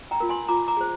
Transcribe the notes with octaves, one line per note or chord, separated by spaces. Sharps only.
G5 A#5
F4 A#4
G#5 C6
F4 A#5 D6
A#5 D6
G#4 C5